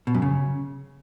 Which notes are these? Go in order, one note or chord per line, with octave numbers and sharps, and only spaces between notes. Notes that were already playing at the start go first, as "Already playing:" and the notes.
B2
F#2
C#3